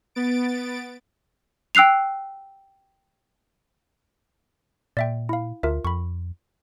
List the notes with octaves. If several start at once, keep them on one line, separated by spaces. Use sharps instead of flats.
B3 A6 D7
G5 E6 F#6 C7 F7
A#2 D5 E5 G5
E4 F5
D2 F4 A#4 E5
F2 B5 C#6